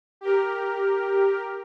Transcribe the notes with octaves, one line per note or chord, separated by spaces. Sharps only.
G4 A#4